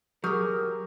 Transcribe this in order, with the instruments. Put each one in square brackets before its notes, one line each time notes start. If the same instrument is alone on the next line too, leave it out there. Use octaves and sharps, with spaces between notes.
[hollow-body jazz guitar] F#3 [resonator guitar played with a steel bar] G4 G#4 [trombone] A#4 [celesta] C#6 F6 G6